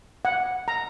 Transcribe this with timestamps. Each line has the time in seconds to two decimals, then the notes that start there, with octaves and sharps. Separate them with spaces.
0.25 F#5
0.68 A#5